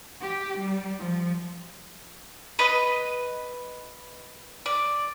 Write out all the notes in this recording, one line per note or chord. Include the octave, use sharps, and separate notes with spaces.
G4
G3
F3
B4 D#5
D5